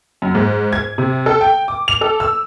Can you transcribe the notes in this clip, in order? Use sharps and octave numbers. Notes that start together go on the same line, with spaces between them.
F#2
G#2
G#6
C3
A4
G5
D6
F7
A4
E6